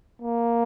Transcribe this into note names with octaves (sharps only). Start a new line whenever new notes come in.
A#3